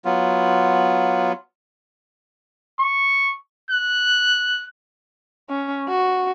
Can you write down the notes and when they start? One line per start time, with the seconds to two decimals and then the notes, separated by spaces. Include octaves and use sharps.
0.05 F#3 B3 F4
2.80 C#6
3.71 F#6
5.49 C#4
5.88 F#4